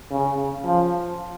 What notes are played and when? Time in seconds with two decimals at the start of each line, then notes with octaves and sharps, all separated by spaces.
0.11 C#3
0.64 F3